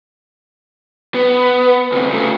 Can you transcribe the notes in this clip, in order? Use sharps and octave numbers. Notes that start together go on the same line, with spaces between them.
B3
D2 C3
C#3 A3